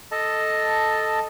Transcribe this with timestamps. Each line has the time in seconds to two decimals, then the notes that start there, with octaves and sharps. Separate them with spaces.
0.12 A4 D#5 A5